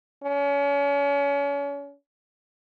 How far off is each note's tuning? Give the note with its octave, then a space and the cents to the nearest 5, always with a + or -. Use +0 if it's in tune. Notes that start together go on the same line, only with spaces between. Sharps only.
C#4 +35